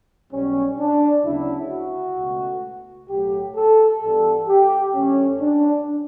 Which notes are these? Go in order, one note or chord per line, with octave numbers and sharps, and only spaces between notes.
B1 B2 G3 B3 C#4
D4
D2 C#3 F#3 B3 E4
F#4
C#2 B2 A3
B1 A2 F#3 A3 G4
A4
G2 E3 G3 B3 A4
G4
F#2 D3 A3 C#4
D4